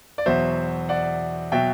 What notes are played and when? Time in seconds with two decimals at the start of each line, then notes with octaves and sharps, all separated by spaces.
0.18 D5
0.26 E2 B2 F#3 C5 E5
0.89 D5 F#5
1.52 B2 F#3 E5 G5